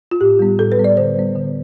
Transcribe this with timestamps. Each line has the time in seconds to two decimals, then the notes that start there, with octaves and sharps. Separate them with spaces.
0.11 F4
0.21 A2 G4
0.39 G3 B3
0.59 A2 A4
0.72 B4
0.77 G3 B3
0.84 D5
0.97 D3 C5
1.15 G3 B3
1.35 D3